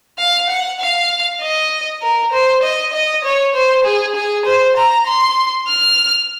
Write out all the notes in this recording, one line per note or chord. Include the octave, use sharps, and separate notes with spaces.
F5
F#5
F5
D#5
A#4
C5
D#5
D#5
C#5
C5
G#4
G#4
C5
A#5
C6
F6